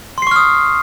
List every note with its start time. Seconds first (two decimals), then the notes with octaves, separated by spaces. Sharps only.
0.18 C6
0.22 C7
0.27 C#6
0.31 F6
0.36 D#6